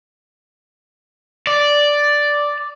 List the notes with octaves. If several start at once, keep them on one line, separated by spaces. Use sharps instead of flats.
D5